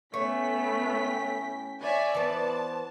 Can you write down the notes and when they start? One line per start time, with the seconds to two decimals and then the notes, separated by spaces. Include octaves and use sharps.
0.14 A2 A3 B3 C#4 C#5 G5 B6
1.81 C#5 D5 E5 G#5
2.14 E3 B3 C5 A5